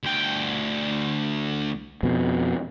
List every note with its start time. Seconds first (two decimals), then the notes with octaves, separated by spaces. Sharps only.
0.04 D2 G5
2.03 F2 B2